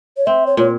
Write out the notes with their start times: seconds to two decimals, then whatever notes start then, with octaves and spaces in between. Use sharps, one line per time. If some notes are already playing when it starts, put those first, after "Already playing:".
0.17 C#5
0.26 C4 E5
0.47 C#5
0.57 A#2 C#5